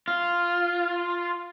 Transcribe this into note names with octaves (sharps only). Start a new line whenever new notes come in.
F4